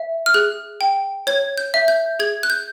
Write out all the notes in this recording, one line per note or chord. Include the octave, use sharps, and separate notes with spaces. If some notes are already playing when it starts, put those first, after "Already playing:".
Already playing: E5
F6
G#4 F#6
G5
C#5 G#6
G6
E5
G6
G#4 G#6
F#6
G6